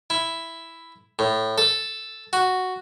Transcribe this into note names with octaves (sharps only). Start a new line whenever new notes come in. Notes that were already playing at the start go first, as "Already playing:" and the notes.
E4
A2
A4
F#4